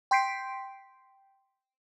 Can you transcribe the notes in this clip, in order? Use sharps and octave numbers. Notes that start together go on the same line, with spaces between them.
G5 C6 G6 B6 C7 D7